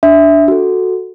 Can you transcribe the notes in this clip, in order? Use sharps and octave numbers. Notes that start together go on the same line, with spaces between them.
D4 E5
F#4 A4